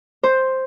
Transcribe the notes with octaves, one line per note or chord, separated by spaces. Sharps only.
C5